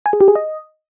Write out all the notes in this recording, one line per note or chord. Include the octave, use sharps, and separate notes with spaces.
G#5
G#4
G4
G#4
D#5